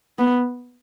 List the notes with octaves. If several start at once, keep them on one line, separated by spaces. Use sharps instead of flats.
B3